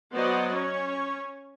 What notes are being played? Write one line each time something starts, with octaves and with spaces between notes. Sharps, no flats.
F#3 B3 F#4 C5 D5 D#5
C#4 C#5